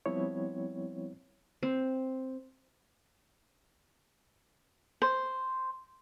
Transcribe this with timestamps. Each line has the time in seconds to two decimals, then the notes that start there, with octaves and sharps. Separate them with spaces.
0.06 F3 G3 B3 C4 E4 C#5
1.63 C4
5.02 C5